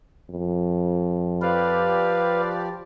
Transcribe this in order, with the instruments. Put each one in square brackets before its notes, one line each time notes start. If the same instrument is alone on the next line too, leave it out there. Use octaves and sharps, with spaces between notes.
[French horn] F2
[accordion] F3 G4 D5 [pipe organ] B4 F5